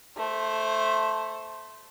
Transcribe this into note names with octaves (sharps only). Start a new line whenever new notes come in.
A3 C5